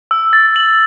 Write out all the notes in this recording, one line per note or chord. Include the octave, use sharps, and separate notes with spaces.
E6
A6
F#7